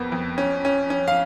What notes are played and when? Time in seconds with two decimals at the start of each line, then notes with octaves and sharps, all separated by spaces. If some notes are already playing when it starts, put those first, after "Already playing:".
Already playing: F2 A#3 B3
0.12 F2
0.38 C#4
0.65 C#4
0.90 C#4
1.08 F5